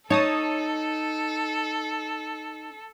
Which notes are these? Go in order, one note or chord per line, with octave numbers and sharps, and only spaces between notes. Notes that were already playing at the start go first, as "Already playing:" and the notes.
D#4 A4 C#5 A5 D#6